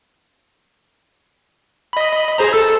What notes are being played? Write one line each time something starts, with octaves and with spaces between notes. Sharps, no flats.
D#5 B5
G#4 C5 A#5
A4 E6